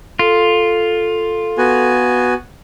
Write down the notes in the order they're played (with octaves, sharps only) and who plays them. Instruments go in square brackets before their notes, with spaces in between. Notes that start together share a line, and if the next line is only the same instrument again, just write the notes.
[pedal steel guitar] F4 [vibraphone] A4
[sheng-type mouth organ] B3 F#4 G#5